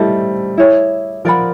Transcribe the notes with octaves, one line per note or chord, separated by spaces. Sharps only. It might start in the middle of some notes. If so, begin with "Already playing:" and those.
Already playing: G3 A3 E4 A4 C5 D#5
E4 G#4 C#5
F3 A#4 D5 F#5 B5